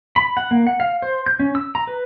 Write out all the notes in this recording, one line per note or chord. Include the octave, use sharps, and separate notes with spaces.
B5
F#5
A#3
F#5
F5
C5
G6
C#4
E6
A#5
B4